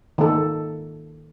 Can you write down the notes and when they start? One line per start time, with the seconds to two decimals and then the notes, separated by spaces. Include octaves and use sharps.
0.18 D#3 A#3 A4